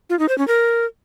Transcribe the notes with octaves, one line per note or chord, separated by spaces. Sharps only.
F4
D#4
C5
C#4
A#4